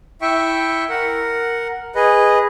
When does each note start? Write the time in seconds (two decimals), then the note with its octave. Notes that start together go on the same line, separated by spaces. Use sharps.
0.22 E4 E5 G5 C#6
0.89 A#4 F#5
1.95 G#4 B4 D#5